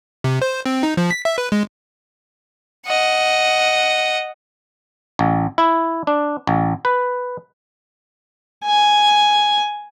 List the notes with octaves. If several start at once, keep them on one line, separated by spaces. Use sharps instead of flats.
C3
C5
C4
D#4
F3
B6
E5
B4
G#3
D#5 F#5
A1
E4
D4
A1
B4
G#5